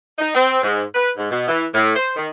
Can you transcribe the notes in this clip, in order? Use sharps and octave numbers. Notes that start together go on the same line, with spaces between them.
D#4
C4
G#2
B4
G#2
B2
E3
A2
C5
D#3